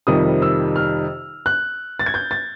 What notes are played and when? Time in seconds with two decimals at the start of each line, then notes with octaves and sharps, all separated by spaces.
0.07 F2 C3 D#3 G3 D#6
0.42 E6
0.76 F6
1.46 F#6
1.99 A6
2.06 G#6
2.14 G6
2.31 A6